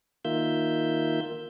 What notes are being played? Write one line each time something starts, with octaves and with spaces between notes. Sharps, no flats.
D#3 A#3 F4 E5 G6